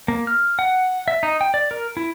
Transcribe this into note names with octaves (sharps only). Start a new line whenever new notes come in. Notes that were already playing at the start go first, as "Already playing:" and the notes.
A#3
F6
F#5
E5
D#4
G5
D5
A#4
E4